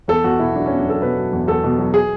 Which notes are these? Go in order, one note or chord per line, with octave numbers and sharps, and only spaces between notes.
E2 A4
E2 F#4
B2 E4
F#3 D4
E2 C#4
D4
E2 A4
B2 B4
F#3
E2
E2 A4
B2
F#3
G#4